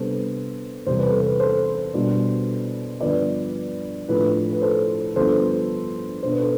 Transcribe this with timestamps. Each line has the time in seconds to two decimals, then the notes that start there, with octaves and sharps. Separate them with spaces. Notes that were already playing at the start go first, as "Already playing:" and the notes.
Already playing: C3 G3 B3 D4 A4 C5
0.86 E2 C3 G3 C4 C5
0.98 B4
1.09 A4
1.21 B4
1.40 A4 C5
1.94 B2 G3 B3 D4
3.01 G2 D3 F3 B3 B4 D5
4.08 A2 F3 A3 D4 B4
4.52 B4
4.62 A4 C5
5.16 G2 D3 F3 B3 A4 C5
6.23 B2 B3 D4 C5
6.32 B4
6.39 A4 C5